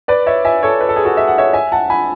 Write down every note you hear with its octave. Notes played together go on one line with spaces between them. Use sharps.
B4 D5
C#5 E5
E5 G#5
A4 C#5
B4
A4
G#4
F#4 A4
E5
F#5
C#5 E5
E5 G#5
F#5 A5
G#5 B5